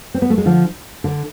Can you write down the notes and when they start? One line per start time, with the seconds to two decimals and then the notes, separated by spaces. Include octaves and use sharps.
0.14 C4
0.22 B3
0.30 A3
0.38 G#3
0.45 D3 F3
1.04 D3